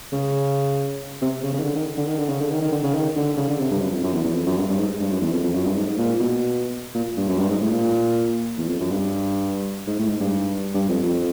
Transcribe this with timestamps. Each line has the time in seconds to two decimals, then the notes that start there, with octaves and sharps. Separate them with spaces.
0.12 C#3
1.21 C3
1.43 C#3
1.54 C#3
1.60 D#3
1.64 D3
1.75 D#3
1.97 D3
2.08 D#3
2.19 D3
2.29 C#3
2.41 D3
2.51 D#3
2.61 D#3
2.72 D3
2.83 C#3
2.94 D#3
3.16 D3
3.37 C#3
3.49 D3
3.60 C3
3.71 G2
3.81 F#2
3.92 F2
4.03 F#2
4.13 E2
4.24 E2
4.35 F2
4.46 F#2
4.57 G2
4.68 G2
4.78 G#2
5.00 G2
5.11 F#2
5.21 E2
5.32 F2
5.44 F2
5.54 F#2
5.65 G2
5.75 G#2
5.86 G#2
5.98 A#2
6.20 B2
6.94 A#2
7.17 G2
7.28 F#2
7.38 G2
7.49 G#2
7.61 A2
7.70 A#2
8.57 E2
8.68 F2
8.80 F#2
8.90 G2
9.87 G#2
9.99 A2
10.09 G#2
10.20 G2
10.74 G2
10.89 F2
11.03 F2